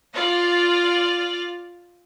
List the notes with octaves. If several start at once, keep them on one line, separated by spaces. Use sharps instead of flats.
F4 D5 F5